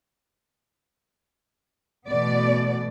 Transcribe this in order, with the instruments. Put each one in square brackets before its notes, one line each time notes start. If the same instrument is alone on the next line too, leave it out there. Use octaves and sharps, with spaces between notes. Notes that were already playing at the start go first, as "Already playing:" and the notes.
[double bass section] B2 E3 A3 [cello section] B3 D5